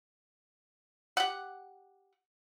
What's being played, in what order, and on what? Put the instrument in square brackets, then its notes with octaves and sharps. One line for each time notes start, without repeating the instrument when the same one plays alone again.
[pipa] G4 F#5